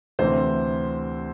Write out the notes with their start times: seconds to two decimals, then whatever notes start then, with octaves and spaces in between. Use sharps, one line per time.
0.19 D2 C3 E3 C5